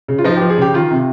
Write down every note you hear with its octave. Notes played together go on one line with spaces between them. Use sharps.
C#3
F4
F3 D#4
F3 G4
G#4
C#3 G4
D#3 F4
C3